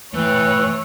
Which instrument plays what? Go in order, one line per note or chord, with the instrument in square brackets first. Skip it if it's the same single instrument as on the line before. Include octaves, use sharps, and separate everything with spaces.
[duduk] E3 [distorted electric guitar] A3 G5 [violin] C#5 [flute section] E6 F#6